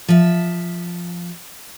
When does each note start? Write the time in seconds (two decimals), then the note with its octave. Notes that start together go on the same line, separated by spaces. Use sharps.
0.09 F3 E5